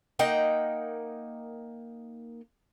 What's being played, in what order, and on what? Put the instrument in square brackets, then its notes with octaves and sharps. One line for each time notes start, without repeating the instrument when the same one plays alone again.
[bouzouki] A#3 D#4 F#5 G5